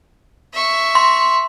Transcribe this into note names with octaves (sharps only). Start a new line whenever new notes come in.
E5 C#6
C6